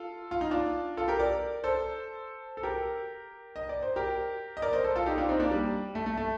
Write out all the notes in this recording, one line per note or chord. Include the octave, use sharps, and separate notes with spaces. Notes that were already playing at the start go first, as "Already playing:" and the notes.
Already playing: F4 A4
F4
D#4
D4 F4
F4 A4
G4 A#4
A#4 D5
A4 C5
A4
G4 A#4
D#5
D5
C5
G4 A#4
D#5
A#4 D5
C5 D#5
A4 C5
F4 A4
D#4 G4
D4 F4
C4 D#4
A#3 D4
G3
A3
A3
A3